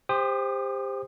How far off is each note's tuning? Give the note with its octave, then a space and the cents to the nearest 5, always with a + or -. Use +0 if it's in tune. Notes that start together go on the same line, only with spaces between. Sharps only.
G4 +25 C5 +0 D#6 -30